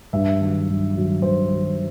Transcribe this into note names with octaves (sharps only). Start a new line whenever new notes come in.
G2 E5
D#3 F#3
G2
D#3 F#3
G2 C5
D#3 F#3